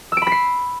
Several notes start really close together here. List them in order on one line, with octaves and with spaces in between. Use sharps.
E6 D7 B5 B6 C7